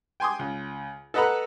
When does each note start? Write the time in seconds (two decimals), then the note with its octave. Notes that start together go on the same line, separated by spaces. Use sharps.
0.20 G5 G#5 C6 D6 D#6
0.39 C#2
1.14 A4 B4 D#5 F#5 A#5 B5